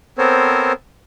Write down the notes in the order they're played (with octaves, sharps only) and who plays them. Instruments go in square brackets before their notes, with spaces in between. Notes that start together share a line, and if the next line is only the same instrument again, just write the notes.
[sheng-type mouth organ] B3 C4 A4 A#4 C5 C#5